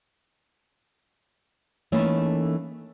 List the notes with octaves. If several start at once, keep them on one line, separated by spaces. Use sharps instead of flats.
E3 A3 A#3 C#4 D#4